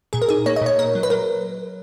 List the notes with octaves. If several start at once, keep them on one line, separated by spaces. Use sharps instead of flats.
A#2 G#4
A#4
D#4 G#4
A#3 C#5
D#5
A#2 C#5
A#2 A#4
F#3
B4
F#3 A#4